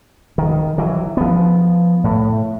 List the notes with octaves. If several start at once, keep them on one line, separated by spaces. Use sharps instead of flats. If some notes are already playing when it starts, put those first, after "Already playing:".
D#3
E3 F#3
F3 B3
A2